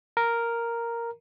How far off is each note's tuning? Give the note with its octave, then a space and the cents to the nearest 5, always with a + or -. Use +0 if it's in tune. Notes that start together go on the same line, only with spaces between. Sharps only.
A#4 +0 A#5 +0